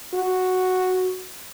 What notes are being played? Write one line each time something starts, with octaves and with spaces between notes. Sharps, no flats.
F#4